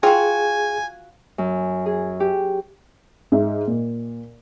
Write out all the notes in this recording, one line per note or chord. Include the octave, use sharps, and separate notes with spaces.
F4 F#4 G#4 G5 G#5
F#2
G#4
G4
G#2 E5
A#2